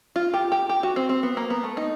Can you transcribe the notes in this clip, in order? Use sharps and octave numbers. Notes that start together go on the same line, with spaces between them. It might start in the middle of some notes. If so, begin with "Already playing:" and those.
F4
G4
G4
G4
F#4
C4
C4
B3
A#3
B3
A3
D#4